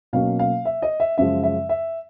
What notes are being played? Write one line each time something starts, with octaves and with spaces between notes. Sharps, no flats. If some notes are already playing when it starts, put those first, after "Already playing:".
B2 F#3 A#3 C#4 F5
F5
E5
D#5
E5
F#2 C#3 F3 G#3 E5
E5
E5